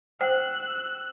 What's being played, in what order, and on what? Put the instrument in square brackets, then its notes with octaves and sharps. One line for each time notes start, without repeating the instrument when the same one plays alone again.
[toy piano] C5 F#5 G5 [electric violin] E6 F#6